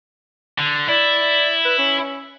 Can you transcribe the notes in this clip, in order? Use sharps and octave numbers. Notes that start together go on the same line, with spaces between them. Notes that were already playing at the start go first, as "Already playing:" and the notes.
D3
E4 D5
B4
C#4